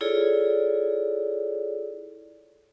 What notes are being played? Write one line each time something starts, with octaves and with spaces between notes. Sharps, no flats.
E4 F4 G#4 A4 C#5 D5